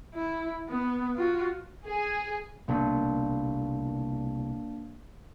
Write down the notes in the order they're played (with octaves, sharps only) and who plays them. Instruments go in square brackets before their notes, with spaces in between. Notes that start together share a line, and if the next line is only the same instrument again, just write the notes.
[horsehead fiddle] E4
B3
F4 F#4
[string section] G#4
[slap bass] C2 B2 D3 [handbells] A#3 D4